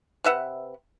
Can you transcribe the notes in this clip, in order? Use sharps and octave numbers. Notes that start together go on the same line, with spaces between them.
C3 B4 E5 F#5